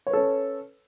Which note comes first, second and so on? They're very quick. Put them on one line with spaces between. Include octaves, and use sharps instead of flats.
C#5 B4 A4 C#4